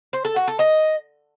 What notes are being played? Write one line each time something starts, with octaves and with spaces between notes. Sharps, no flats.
C5
A4
F#4
A4
D#5